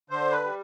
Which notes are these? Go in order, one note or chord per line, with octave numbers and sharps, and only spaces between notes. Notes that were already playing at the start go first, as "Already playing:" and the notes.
D3 C5
B4
G3